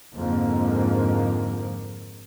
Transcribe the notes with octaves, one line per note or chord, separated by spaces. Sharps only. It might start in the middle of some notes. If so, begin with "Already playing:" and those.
F2 G#2 D3 F3 A#3